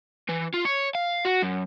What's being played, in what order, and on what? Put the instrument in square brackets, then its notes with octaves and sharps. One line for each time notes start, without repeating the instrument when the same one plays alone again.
[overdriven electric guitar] E3
F4
C#5
F5
F#4
F#2